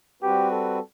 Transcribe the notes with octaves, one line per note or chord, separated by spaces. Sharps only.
G3 C4 F#4 G4 B4
A4